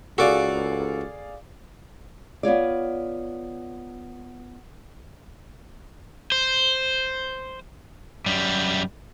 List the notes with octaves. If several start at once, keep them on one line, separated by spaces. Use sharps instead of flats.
C#2 F#4 G#4 A4 D5 F5 D6
B3 F4 C#5 D5
C5
F#2 G3